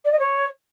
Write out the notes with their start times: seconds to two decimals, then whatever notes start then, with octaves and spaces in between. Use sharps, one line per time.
0.04 D5
0.11 D#5
0.19 C#5